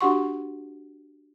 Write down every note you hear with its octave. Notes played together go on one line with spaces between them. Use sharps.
D4 F#4 G4 F#5 C6 C#6